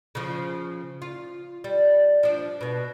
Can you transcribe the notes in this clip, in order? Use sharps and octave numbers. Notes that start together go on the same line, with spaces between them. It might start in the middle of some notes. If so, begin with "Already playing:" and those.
C#3 F3
F4
G3
F3 D4
B2 B3